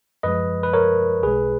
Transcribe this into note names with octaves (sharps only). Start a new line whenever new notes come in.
F#2 F3 G#3 B4 D#5
B4
A#4 C#5
B1 B2 G#3 G#4 B4